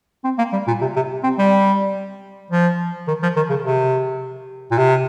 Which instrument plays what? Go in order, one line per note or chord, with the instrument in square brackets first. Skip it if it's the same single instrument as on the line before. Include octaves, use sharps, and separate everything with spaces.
[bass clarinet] C4
A#3
G3
A#2
C3
C3
C4
G3
F3
D#3
F3
D#3
C#3
C3
A#2
C3